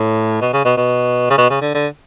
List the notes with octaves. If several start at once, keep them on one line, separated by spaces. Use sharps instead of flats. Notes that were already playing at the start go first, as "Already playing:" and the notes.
Already playing: A2
B2
C#3
B2
B2
C#3
B2
C#3
D3
D3